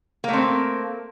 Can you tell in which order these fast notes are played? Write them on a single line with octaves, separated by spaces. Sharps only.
A#3 A3 C4